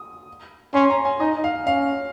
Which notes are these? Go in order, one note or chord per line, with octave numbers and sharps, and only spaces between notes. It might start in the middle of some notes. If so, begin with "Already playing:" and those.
Already playing: D#6
C#4 C6
A#5
G#5
D#4 D#5
F5
C#4 F5